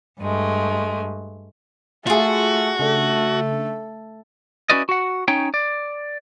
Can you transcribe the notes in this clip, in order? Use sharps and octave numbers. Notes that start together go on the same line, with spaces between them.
G2 G#3 A3
A3 F4 F#4 G#4
C#3 A3 D4 A4
C#4 E4 F#4 B4 D5 D#5
F#4 F#5
C#4 D#4 C#5 G5
D5